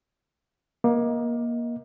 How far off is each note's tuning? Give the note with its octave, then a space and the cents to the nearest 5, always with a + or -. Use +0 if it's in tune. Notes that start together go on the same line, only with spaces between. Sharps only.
A#3 +25 D#5 +25